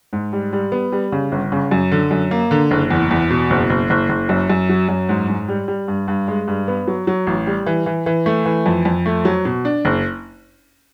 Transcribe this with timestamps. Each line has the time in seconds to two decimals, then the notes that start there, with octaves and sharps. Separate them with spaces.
0.13 G#2
0.33 G3
0.53 G3
0.72 B3
0.92 G3
1.12 C#3
1.32 G1
1.52 C#3
1.71 F#2
1.92 D3
2.11 F#2
2.31 A#3
2.51 D3
2.71 F#1
2.90 E2
3.11 E2
3.30 B2
3.50 F#1
3.70 F#1
3.90 F#1
4.09 F#1
4.29 F#2
4.50 F#2
4.69 F#3
4.89 F#2
5.09 G#2
5.28 G#2
5.48 G3
5.68 G3
5.88 G2
6.08 G2
6.28 G#3
6.48 G2
6.68 B3
6.87 F#3
7.07 F#3
7.27 A1
7.47 G3
7.66 E3
7.86 E3
8.06 E3
8.26 A3
8.46 E3
8.66 F2
8.85 F2
9.06 A3
9.25 F#3
9.45 B2
9.65 D4
9.85 F#1